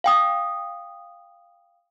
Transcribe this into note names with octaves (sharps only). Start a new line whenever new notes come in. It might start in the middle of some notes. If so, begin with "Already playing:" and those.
F5 G5 D#6